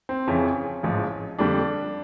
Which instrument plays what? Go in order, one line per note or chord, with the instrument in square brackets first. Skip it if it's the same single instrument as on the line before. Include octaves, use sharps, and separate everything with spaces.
[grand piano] C4
F2 C#3 E3 C#4
A1 G#2 F3
F2 D3 G3 D4